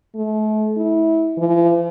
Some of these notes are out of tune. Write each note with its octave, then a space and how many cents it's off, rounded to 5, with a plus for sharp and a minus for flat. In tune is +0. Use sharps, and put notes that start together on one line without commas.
A3 -35
E4 -20
F3 -45